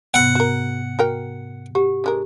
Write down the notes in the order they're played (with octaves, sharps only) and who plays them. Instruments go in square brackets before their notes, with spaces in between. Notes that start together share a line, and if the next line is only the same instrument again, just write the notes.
[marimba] G#2 C3 B3 [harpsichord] F#5
[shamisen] F#4 A#4
F#4 A#4 G5
[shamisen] F#4 [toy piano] G4
[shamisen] D3 G#3 A#4